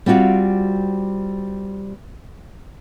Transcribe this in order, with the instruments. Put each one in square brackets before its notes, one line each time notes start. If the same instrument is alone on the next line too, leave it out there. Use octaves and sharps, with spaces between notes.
[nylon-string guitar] G3 C4 F4 F#4 F5